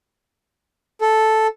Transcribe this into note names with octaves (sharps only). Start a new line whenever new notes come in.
A4